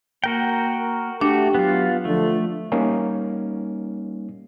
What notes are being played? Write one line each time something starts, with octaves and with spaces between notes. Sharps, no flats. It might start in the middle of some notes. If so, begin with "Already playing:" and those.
A#3 F#4 A#4 G5
A3 D4 F#4 G4 E5
F#3 B3 F4
D3 F3 A3
G3 A#3 C#4 D#4